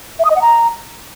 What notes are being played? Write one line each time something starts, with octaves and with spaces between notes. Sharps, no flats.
E5
D#6
D#5
F#5
A#5